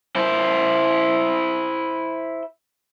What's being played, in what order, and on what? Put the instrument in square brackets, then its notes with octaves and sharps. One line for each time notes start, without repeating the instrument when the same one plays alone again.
[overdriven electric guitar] E4 C5